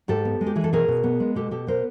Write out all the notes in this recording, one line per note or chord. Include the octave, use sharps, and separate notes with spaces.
G#2 G4 A4
B3
G#3
G4
E3 G#4
A4
B2 G#4 A#4
B2
B3
G#3
B2 G4 A4
B2 G4 A4
B3 A#4 C5